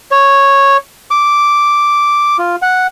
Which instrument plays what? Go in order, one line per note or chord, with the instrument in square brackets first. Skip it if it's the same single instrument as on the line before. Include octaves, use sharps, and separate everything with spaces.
[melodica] C#5
D6
F4
F#5